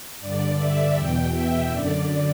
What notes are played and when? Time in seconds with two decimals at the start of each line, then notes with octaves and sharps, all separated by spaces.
0.20 G2 D3 D5
0.59 E5
0.95 E2 B2 G5
1.33 E5
1.70 F#2 D3 D5